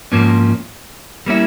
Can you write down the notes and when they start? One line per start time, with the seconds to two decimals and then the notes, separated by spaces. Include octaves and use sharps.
0.12 G#2 F3 A#3 C#4
1.26 G3 A#3 C#4 E4